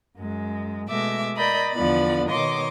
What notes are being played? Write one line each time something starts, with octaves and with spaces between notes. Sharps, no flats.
F#2 G#3
B2 G#3 A3 E5 D6
A#4 D5 D#5 B5 G6
E2 D3 F3 B3 D5 B5
B2 D#3 C#5 D#5 C6 D6